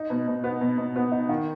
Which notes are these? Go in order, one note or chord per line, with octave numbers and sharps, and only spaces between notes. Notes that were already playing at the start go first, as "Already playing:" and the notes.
Already playing: D#4
B2
B2
B3
B2
B2
B3
D#4
D#3